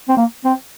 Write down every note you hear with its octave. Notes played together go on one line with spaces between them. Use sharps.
C4
A#3
C4